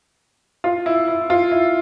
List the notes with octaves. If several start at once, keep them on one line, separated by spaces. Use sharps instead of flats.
F4
E4
E4
F4
E4